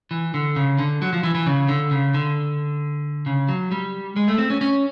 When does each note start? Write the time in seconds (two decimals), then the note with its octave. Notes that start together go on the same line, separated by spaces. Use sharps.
0.11 E3
0.34 D3
0.56 C#3
0.78 D3
1.02 F#3
1.13 F3
1.23 E3
1.35 E3
1.46 C#3
1.68 D3
1.91 C#3
2.14 D3
3.26 C#3
3.49 F#3
3.72 G3
4.16 G#3
4.28 A3
4.38 C4
4.50 C#4
4.61 C#4